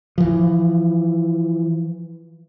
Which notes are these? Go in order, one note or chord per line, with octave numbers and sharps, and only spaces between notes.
E3 F3